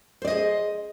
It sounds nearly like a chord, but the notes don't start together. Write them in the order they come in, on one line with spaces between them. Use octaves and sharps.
C5 D5 D#5 G#4